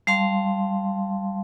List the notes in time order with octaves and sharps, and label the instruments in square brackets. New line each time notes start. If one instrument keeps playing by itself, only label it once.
[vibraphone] G3 F5 A5 C6